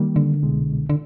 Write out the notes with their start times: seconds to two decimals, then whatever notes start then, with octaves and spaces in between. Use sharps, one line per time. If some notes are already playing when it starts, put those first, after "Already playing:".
Already playing: D#3 G3 A#3
0.16 D3
0.43 C2 B2 G#3
0.89 D3